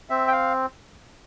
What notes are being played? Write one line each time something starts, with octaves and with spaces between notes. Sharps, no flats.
C4 E5
G5
F5